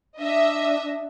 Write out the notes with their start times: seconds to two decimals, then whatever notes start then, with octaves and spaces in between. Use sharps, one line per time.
0.19 D4 D#5 E5